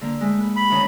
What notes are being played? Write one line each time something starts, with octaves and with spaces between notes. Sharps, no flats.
D3 A#3
G#3 A3
B4
B5
D2 D#3 C#4